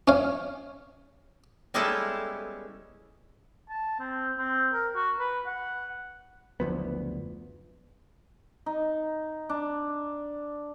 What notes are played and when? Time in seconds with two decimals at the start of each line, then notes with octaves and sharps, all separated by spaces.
0.08 C#4 F5
1.74 G3 G#3 B3 C#4 E4 A4
3.69 A5
4.00 C4
4.38 C4
4.73 A#4
4.96 F#4
5.20 B4
5.47 F#5
6.60 F#1 D2 F3 B3
8.66 D#4
9.49 D4